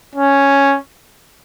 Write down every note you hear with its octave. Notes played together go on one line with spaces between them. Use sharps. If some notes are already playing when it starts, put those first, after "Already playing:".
C#4